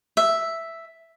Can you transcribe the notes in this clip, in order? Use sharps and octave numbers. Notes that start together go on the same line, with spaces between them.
E5